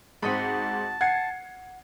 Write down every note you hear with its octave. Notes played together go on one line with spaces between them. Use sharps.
G#2 C4 F#4 D#5 A5 B5
F#5 G#6 C7